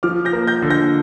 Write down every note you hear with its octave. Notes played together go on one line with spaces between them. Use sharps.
F3 D6 F6
G6 A#6
A#3
G6 A#6
D3
G6 A#6